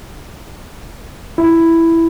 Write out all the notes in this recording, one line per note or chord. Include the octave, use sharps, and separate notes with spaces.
E4